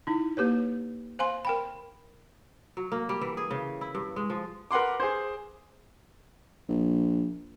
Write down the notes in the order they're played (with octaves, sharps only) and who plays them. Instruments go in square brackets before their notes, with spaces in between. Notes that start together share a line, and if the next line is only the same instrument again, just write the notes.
[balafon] D#4 E4
A#3 G4 B4 C#5
C5 F5 G#5 C6
A#4 G5 B5
[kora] F#3
A#3
G3
E3
G#4
C#3
E4
G2
G#3
F3
[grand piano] A#4 B4 F#5 C6 D6
G#4 C5
[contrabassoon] A#1